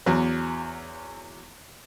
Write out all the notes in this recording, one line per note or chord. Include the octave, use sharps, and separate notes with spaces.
E2 F#3